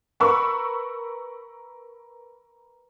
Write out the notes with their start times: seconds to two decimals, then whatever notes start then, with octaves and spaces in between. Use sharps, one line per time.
0.20 A#4 B4 B5 C#6 E6